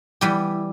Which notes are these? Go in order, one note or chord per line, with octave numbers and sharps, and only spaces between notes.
E3 G3 B3 G4